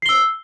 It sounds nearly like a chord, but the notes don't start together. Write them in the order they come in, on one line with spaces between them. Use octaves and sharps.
C7 G7 E6